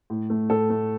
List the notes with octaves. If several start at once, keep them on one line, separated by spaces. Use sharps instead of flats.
A2
A3
A2 A4
A3